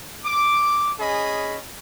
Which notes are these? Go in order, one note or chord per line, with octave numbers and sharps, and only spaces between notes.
D6
C#4 G#4 D#5 B5